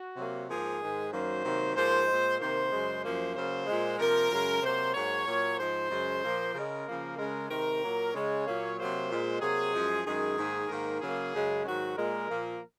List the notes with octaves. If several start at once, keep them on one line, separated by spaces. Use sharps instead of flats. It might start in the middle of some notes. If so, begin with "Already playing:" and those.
Already playing: F#4
C3 F#3 A#3
G#2 F3 A#3 G#4
G#2 D#3 G#3
F#2 D#3 F#3 A#3 C5
C3 D#3 F#3 A#3
G#2 F3 A#3 C5
A#2 G#3
C3 D#3 A#3 C5
F#2 C#3 G#3
F#2 F3 A#3 C5
C#3 F#3 A#3 C5
A#2 G#3
C3 F3 A#3 A#4
F#2 C#3 G#3
C3 F#3 A#3 C5
G#2 F#3 A#3 C#5
A#2 F#3 A#3
G#2 F3 G#3 C5
F#2 C#3 G#3
A#2 F3 A#3
C#3 G#3 A#4
C#3 F3 A#3
C#3 G#3 A#4
C3 D#3 G#3 A#4
A#2 F#3 A#3
C#3 G#3 C#5
A#2 F#3 A#3
C3 F#3 A#3 C5
A#2 G#3
C3 F#3 A#3 G#4
F#2 F3 G#3
F#2 D#3 G#3 G#4
G#2 D#3 A#3
G#2 D#3 A#3 A#4
C#3 F#3 A#3 G#4
F#2 C#3 G#3
G#2 D#3 F#3 F#4
A#2 G#3 A#4
A#2 F3 A#3